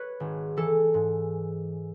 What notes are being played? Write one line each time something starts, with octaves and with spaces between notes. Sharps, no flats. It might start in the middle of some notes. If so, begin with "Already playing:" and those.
Already playing: B4 C#5
G#1
E3 A4
G#2